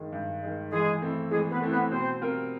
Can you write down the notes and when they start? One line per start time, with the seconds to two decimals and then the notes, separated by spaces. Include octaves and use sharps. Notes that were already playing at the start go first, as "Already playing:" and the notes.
Already playing: G2 D#3 G#3
0.12 G2
0.43 D#3 G#3
0.72 E3 G#3 G#4
1.02 A3 C4 E4
1.31 E3 G#3 G#4
1.51 B3 B4
1.61 A3 C4 E4
1.71 B3 B4
1.91 B2 C4 C5
2.21 G3 C4 F4 A#4